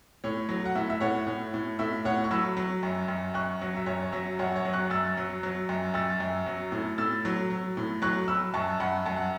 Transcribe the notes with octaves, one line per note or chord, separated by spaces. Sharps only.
A2 C#5
F#3
F#5
A2 E5
E5
A2 C#5 F#5
A2
A2
A2 E5
A2 C#5 F#5
C#6
F#3 B5 E6
F#3
F#2
F#2
F#2 C#6 F#6
F#3
E5
F#2 C#5
C#5
F#3 E5
F#2 C#5 F#5
C#5 F#5
F#3
C#6 F#6
F#2 E6 A6
F#3
F#3
F#2
F#2 E6 A6
F#2
F#3
A2
A2 E6 A6
F#3
F#3
A2
F#3 C#6 F#6
F#3 B5 E6
F#2 A5 C#6
F#2 F#5 B5
F#2 A5
F#5